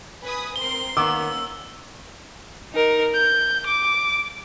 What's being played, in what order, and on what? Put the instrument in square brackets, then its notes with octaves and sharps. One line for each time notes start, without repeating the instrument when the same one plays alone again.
[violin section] B4 G#5 D#6
[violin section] C4 A#4 C6 [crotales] G7
[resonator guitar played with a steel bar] D#3 B3 [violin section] A#3 C#4 [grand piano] D6 [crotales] E6
[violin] D#4 A#4
G6
D6